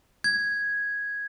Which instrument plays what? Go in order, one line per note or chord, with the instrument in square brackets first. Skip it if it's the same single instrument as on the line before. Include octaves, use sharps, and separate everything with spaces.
[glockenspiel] G#6